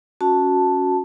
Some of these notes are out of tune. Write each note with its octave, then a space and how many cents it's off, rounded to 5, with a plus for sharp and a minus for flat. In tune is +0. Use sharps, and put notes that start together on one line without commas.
C#4 +5 F#4 -15 A5 +0